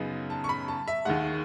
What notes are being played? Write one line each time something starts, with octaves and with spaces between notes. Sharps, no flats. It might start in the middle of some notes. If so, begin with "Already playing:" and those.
Already playing: F#2 C#3 F#3 B3 D#4
A5
C#6
B5
A5
E5
D#2 D#3 G#3 F#5